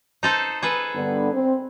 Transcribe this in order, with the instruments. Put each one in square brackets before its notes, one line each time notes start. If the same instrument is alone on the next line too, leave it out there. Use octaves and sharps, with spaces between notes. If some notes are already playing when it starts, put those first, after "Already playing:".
[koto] D#4 A4 C5
G#4 A4 B4
[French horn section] G2 D3 B3
C4